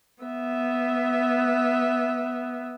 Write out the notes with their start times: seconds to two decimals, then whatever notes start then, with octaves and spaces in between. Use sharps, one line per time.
0.23 B3 E5